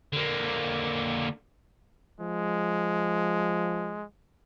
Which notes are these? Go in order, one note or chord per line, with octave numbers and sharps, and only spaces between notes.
D3 A#3
F3 G#3